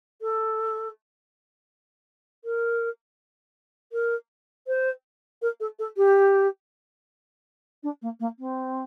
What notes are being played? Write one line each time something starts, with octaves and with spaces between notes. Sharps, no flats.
A4
A#4
A#4
C5
A#4
A4
A4
G4
D4
A#3
A#3
C4